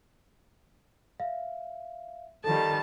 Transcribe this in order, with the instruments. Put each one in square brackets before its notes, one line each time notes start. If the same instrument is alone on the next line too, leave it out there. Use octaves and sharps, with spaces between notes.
[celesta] E5 F5
[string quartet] D#3 F3 G3 [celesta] A4 [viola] A5